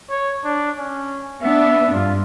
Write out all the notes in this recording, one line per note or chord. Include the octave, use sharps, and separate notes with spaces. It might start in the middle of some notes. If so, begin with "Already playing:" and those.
C#5
D4
C#4
B3 D4 E5
G2 F4